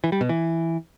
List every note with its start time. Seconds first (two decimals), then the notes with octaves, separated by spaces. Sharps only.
0.04 E3
0.12 G3
0.21 B2
0.29 E3